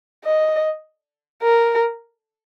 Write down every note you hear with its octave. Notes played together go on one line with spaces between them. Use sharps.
D#5
A#4